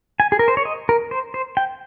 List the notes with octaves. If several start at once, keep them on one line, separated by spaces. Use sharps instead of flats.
G#5
G#4
A#4
C5
C#5
D#5
A#4
C5
C5
G5